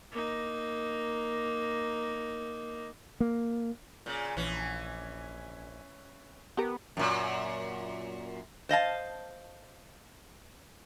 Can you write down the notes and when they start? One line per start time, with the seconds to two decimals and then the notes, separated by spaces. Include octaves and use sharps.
0.12 A#3 D#4
3.20 A#3
4.06 A#2 C#3
4.37 A#1 E3 C#4
6.57 B3 G4 A#4
6.97 F#2 A#2
8.69 C5 D#5 F5 A5